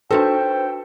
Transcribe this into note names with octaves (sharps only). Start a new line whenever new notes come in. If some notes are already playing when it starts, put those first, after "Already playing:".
D4 D#4 F#4 A4 B4 C5 G5